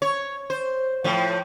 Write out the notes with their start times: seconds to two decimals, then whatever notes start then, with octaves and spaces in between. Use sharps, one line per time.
0.02 C#5
0.50 C5
1.04 A2 F3